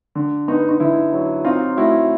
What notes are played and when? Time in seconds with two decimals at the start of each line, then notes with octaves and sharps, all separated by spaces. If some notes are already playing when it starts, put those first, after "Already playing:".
0.15 D3
0.48 B3 D#4
0.69 D#4
0.80 D3 E4
1.13 F#3
1.45 C4 D#4 F4
1.77 A3 E4 F#4